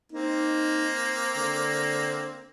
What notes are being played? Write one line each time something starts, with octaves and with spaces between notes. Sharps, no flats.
A#3 C4 D#4
D3